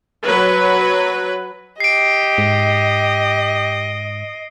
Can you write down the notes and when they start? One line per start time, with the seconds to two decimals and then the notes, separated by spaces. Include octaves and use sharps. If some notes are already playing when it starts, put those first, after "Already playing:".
0.24 F#3 B4
1.80 G4 D#5 C7 D7
2.38 G#2